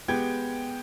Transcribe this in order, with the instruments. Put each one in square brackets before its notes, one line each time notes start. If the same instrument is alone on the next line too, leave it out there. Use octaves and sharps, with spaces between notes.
[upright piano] G#3 B3 G4 G5 G#6